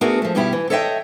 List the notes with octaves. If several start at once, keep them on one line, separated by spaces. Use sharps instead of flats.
A3 B3 D4 F#4 G#4 A#4
F3 A3
G2 B2 G3 E4 G4
E3
A4 C#5 D#5 E5 F#5 G5